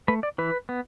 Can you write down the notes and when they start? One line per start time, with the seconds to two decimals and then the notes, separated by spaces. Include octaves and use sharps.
0.08 A3 B4
0.23 D5
0.38 E3 B4
0.69 B3